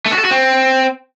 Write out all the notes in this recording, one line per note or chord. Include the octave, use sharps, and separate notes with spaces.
A3
F#4
A4
F#4
C4